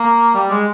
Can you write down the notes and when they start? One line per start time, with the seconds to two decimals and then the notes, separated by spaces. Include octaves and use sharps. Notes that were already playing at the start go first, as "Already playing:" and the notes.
Already playing: A#3
0.35 G3
0.51 G#3